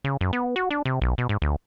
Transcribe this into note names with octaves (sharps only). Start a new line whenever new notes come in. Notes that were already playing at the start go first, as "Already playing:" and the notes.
C#3
F#2
B3
F#4
D4
C3
B1
B2
G#2
D2